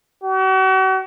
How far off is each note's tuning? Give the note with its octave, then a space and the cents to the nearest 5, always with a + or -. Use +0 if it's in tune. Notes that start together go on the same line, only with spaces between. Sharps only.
F#4 +40